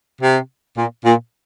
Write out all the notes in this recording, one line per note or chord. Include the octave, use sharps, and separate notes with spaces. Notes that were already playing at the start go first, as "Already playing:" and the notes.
C3
A#2
A#2